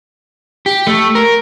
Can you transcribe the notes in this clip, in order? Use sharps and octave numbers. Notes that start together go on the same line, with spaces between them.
G4
A3
A#4